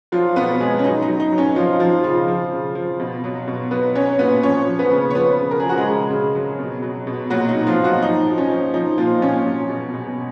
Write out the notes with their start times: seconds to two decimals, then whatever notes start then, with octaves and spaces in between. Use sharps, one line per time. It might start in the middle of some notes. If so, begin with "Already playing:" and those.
0.12 F3 F#3 F4
0.36 B2 B3 B4
0.60 F#3 G#3 G#4
0.79 C#4
0.84 F#3 D#4
1.02 D#4
1.08 F#3
1.20 D#4
1.32 F#3
1.38 C#4
1.56 F3 F4
1.73 D#4
1.80 F3 F4
2.04 C#3 F3 F4
2.28 F3
2.52 C#3
2.75 F3
3.00 B2
3.24 F#3
3.48 B2
3.71 F#3 B3 B4
3.95 F#3 C#4 C#5
4.19 A#2 B3 B4
4.43 F3 C#4 C#5
4.67 F3
4.79 B3 B4
4.91 C#3
5.10 C#5
5.15 F3 B3 B4
5.39 C#3
5.51 A#4
5.60 F3 G#4
5.69 F#4
5.77 G#3 G#4
5.87 C#3
6.11 C#3
6.35 F#3
6.59 B2
6.82 F#3
7.07 B2
7.30 A#2 F#3 F#4
7.49 D#4
7.54 A#2
7.67 F3 F4
7.78 A#2
7.84 F#3 F#4
8.02 F3 D#4
8.26 F3
8.38 C#4
8.50 F3
8.74 F3 D#4
8.98 A#2 F3 F4
9.22 A#2 C#4
9.46 F#3
9.70 B2
9.94 B2